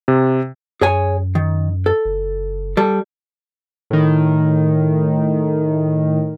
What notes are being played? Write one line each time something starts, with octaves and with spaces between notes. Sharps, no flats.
C3
F#2 G#4 C#5 G#5
D#3
A4
F#1
G3 A4
A2 D#3